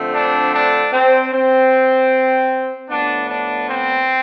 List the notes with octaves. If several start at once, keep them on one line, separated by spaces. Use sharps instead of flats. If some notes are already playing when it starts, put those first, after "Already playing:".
Already playing: D3 F3 A3 C4
D4
D4
C4
C4
A2 F3 B3 D4
D4
C4